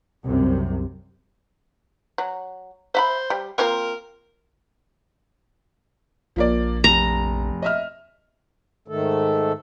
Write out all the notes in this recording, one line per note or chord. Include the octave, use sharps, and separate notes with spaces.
C2 F#2 C3
F#3
C5 E5 F#5 B5
G3
A#3 C4 F4 A#4
A#1 F3 A#3 D5
F1 A#5
D#5 E5 F6
G#2 D#3 A3 A4